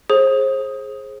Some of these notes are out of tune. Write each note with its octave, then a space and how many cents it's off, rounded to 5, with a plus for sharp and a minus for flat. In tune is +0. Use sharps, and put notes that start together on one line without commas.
G#4 +10 C5 +35